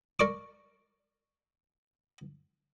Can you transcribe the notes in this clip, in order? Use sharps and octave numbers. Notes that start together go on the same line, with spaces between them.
A#4 D5 C#6 D6